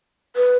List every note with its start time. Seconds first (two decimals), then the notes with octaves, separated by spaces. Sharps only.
0.36 B4